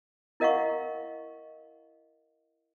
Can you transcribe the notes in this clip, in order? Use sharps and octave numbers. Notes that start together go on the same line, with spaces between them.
E4 A#4 D#5 F5 F#5 C#6